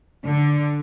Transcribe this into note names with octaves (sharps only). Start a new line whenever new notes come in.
D3